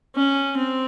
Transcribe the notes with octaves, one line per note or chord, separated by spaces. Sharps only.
C#4
C4